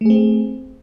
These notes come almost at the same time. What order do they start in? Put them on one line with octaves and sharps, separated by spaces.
A3 G#4 C4